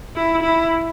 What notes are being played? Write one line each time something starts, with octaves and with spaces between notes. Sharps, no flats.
E4
E4